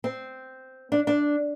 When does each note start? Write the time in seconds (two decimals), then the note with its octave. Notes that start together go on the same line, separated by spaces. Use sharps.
0.04 C4
0.92 D4
1.07 D4